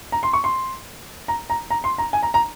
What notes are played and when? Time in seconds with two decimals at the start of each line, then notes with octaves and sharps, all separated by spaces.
0.12 A#5
0.23 C6
0.33 C#6
0.44 C6
1.28 A#5
1.50 A#5
1.70 A#5
1.84 C6
1.98 A#5
2.13 G#5
2.23 A#5
2.34 A#5